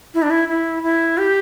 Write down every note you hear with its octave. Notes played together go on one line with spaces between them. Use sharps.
E4
D4
E4
E4
E4
G4